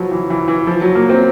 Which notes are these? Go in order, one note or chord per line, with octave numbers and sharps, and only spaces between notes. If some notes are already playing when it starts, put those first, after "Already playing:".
Already playing: F3 F#3 B3
E3
E3
E3
F3
F#3
A#3
C4